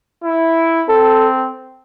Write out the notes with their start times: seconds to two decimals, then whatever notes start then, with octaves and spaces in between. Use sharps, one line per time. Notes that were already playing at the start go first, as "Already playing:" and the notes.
0.23 E4
0.89 C4 A4